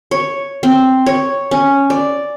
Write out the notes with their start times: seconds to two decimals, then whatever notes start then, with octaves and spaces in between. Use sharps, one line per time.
0.11 C#5
0.63 C4
1.06 C#5
1.51 C#4
1.90 D5